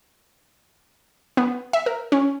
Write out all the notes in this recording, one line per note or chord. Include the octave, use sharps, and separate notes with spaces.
B3
E5
A#4
C#4